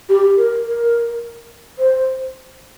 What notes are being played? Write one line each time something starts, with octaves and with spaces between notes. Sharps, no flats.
G4
A#4
A#4
C5